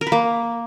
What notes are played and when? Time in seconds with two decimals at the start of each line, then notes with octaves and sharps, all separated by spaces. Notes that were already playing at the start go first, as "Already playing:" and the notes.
0.01 A#4
0.07 B4
0.12 A#3